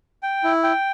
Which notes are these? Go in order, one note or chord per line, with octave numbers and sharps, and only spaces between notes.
G5
E4
G5